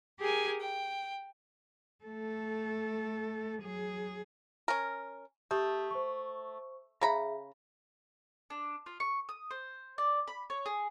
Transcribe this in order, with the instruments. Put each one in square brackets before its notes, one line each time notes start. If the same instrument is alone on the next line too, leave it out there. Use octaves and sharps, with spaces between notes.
[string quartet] G4 G#4 A#4 G#5
G5
[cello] A3 A4
F#3 G#4
[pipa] C#4 A#4
[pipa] A3 [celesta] G4 D#6 G6
[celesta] C5 C#6
[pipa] C#3 A#5 B5 [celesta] G#4 E5
[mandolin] D4
F4
C#6
D#6
C5
D5
B5
C#5
G#4